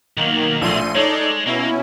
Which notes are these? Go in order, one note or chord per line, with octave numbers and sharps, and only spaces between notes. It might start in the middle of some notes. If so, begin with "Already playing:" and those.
B1 D#3 F#3 A#3
A#1 A3 C6 D#7
G#3 D#4 A4 C#5 D5
B2 A#3 C#4 E4